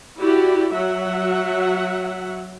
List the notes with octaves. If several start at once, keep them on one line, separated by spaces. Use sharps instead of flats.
E4 F#4 G4 D5
F#3 E5 F#5